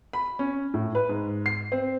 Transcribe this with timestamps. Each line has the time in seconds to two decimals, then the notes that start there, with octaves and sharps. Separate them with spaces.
0.13 B5
0.39 C#4
0.74 A2
0.95 B4
1.09 G#2
1.46 C7
1.72 C4